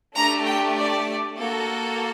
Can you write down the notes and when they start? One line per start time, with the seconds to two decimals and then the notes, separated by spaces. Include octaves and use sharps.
0.16 A3 D4 G4 A#5
0.46 G5
0.77 D5
1.38 A#3 F#4 A4